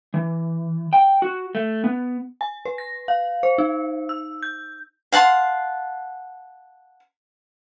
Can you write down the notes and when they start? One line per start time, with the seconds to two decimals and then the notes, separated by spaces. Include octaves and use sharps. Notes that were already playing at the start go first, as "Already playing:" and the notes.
0.14 E3
0.93 G5
1.22 F#4
1.55 A3
1.84 B3
2.41 G#5
2.65 B4
2.78 A#6
3.08 F5
3.43 C5
3.58 D#4
4.09 E6
4.43 G6
5.12 F5 F#5 A5 C6